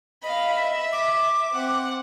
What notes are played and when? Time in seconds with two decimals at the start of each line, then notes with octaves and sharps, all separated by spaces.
0.23 D#5 F5 B5
0.59 E5
0.92 D6
1.52 C4 F#5